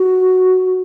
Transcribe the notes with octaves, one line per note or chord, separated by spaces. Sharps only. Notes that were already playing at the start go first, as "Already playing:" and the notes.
Already playing: F#4